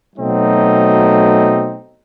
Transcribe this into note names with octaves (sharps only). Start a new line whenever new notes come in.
B2 F#3 A3 C4 D#4